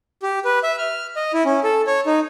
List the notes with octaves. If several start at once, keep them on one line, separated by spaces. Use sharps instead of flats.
G4
B4
E5
F6
D#5
E4
C#4
A4
C#5
D#4